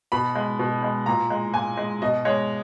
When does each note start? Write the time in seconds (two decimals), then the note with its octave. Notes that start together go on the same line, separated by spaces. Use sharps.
0.12 B2 B5
0.35 G#3
0.59 B2
0.83 G#3
1.06 A#2 A#5
1.30 G#3
1.54 A#2 G#5
1.77 G#3
2.02 B2 D#5
2.25 G#3 C#5